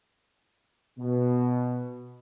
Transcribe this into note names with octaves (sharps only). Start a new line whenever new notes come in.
B2